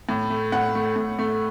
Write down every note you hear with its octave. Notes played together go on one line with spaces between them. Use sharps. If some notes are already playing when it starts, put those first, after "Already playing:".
A2
A3
A2 F#5
A3
A2
A3